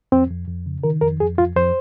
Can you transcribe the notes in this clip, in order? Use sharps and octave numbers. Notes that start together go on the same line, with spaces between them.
F2 C4
F2
F2
C#3
D#3 A#4
F2 A#4
F2 G#4
F2 F4
F2 C5